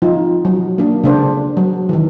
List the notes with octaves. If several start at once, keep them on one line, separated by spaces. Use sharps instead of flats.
F3 D#4 F4
F#3
A#3 D4
C#3 D4 C5
F#3
D#3 E3